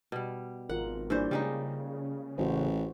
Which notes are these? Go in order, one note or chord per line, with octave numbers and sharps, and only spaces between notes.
B2 G3
G#1 F4 A#4 F#5
G2 E3 A#3 C5 D5
C#3 G3 G#3 D#4
A1 F#4 C5